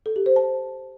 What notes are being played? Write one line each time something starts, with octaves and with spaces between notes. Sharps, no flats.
A4
G4
C5
A5